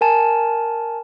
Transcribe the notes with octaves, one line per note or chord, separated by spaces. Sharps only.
A#4 G#5 A5